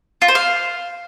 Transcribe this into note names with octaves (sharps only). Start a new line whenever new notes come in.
F4
C5
F5